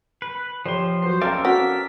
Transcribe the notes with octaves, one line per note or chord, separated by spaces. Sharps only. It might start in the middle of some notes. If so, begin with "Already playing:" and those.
B4
F3 G4 C5 C#5 C6
F#3 B4 C5 C7
C#4 A4 A#4 D5 F5 G5 A#5
F#4 F#5 B6